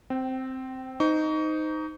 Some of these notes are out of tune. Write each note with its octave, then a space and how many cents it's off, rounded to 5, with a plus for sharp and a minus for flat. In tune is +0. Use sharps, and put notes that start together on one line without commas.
C4 +0 G5 -25
D#4 +0 C5 -25 C#6 +35